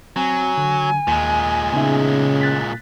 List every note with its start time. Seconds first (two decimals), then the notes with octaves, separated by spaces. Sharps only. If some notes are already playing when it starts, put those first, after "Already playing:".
0.16 F#3 C4 G#5
0.57 D3
1.07 D#2 A#2 G#3
1.73 C#3 B3 D#4 E5
2.41 F#6 A6 B6